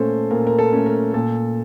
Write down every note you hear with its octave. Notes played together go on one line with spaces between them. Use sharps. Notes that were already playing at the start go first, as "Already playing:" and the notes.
Already playing: A#2 A3 C#4 A4 C5
A#2 A#4
A#4
A4
A3 C#4
A#4
A#2 A4